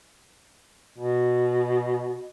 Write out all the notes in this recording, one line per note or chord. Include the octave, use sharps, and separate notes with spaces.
B2